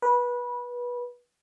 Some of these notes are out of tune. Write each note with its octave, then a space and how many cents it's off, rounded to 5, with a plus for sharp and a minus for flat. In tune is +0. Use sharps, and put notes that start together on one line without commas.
B4 -20